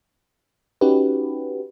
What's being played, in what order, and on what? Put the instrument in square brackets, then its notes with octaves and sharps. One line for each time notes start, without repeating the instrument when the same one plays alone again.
[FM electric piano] C#4 D#4 F#4 G4 B4